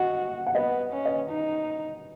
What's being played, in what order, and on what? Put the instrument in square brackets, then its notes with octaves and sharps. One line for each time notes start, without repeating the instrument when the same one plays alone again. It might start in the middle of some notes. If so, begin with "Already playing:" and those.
Already playing: [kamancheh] F#4 [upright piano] D#5 F#5
[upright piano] F#5
[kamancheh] B3 [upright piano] B4 D#5
[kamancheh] C#4
[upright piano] B4 D#5
[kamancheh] D#4